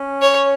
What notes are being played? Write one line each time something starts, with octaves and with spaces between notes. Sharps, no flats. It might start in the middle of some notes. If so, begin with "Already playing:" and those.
Already playing: C#4
C#5